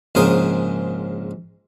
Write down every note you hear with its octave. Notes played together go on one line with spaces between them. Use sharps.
A#1 G#2 C#3 A#4 C5 D#6